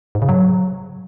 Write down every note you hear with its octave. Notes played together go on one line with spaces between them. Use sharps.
G#2
C#3
F#3